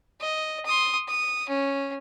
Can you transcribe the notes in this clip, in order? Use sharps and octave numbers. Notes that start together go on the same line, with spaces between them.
D#5
C6 D#6
D#6
C#4